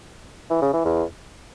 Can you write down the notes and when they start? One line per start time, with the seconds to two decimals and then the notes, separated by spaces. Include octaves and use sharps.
0.50 E3
0.62 C#3
0.73 E3
0.85 E2